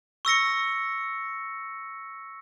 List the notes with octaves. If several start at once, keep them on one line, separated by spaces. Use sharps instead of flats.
C#6 E6 A#6 C#7